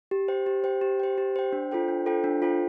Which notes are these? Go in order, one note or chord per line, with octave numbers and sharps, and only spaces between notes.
G4
C5 G5
G4
C5 G5
G4
C5 G5
G4
C5 G5
D4
F4 A4 C5 G5
D4
F4 A4 C5 G5
D4
F4 A4 C5 G5